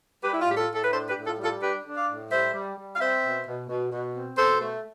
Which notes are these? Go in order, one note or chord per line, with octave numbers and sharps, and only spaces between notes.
G3 G4 B4
E4
F4
A2 G4
F4 A4
A2
A4
B4
D4 A4 C5
G4 B4
A2
F4 A4
G3
F4 A4
D4 G4 B4
D4
D5 F5
A2
G3 C5 E5
G3
G3
F5
C4 C5 E5
B2
B2
B2
B2
C4
B2 A4 C5
A3